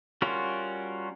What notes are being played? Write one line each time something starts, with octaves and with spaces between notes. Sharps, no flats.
G3 C#4 F4 F#4 A#4